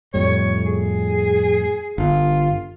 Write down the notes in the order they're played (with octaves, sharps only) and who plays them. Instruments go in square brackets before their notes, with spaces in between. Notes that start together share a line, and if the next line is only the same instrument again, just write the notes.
[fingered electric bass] F2 A2 G3 [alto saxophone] C#5
[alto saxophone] G#4
[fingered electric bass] G1 [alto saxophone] F4